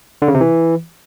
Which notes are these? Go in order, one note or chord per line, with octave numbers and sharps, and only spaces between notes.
D3
C#3
C3
E3